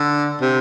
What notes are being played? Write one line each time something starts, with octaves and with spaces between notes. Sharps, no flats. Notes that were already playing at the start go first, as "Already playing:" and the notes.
Already playing: D3
C3